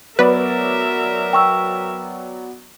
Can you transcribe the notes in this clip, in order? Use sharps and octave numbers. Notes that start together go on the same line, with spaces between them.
F#3 B3 A#4 B4 D5 E5
G5 C#6 E6